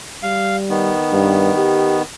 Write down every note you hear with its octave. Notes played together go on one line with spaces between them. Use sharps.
G3 F5
D#3 B3
G2
G4